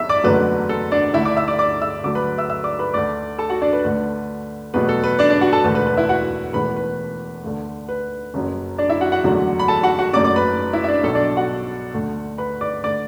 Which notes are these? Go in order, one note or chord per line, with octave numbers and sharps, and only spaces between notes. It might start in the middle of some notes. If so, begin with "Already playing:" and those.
Already playing: B1 B2 E5 E6
D5 D6
F#1 E2 D3 F#3 A3 B4
A4
D4 D5
D2 D3 A3 E4 E5
D5 D6
E5 E6
D5 D6
D5 D6
E5 E6
D2 D3 F#3 A3 D5 D6
B4 B5
E5 E6
E5 E6
D5 D6
B4 B5
D2 D3 A3 D5 D6
A4 A5
F#4 F#5
D4 D5
B4
D2 D3 A3
E2 B2 F#3 A3 B4
A4
B4
D4 D5
D4 D5
F#4 F#5
A4 A5
E1 D2 D3 A3 B4
B4
B4
E4 E5
F#4 F#5
E1 E2 E3 A3 B4 B5
B4
D2 D3 A3
B4
F#1 F#2 F#3
D4 D5
E4 E5
F#4 F#5
F#4 F#5
F#1 E2 D3 F#3 A3
B5
A4 A5
F#4 F#5
F#4 F#5
F#1 F#2 F#3 A3 D5 D6
D5 D6
B4 B5
E4 E5
E5
D4 D5
B1 B2 F#3 A4
D4 D5
F#4 F#5
D2 D3 A3
B4 B5
D5 D6
D3 A3 D5 D6